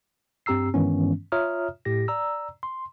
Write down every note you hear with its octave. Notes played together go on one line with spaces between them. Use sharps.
G2 C4 G4 A#5 E6 C7
G2 D#3 E3 G#3 B3 C#4
F4 C#5 E5 A#5 D#6 F6
A2 G4 A#6
D5 A#5 E6
C6